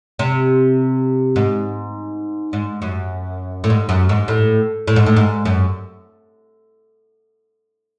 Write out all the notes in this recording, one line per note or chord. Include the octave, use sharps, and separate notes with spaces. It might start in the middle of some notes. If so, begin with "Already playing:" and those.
C3
G#2
G#2
F#2
A2
G#2
F#2
G#2
A2
A2
G#2
A2
G#2
F#2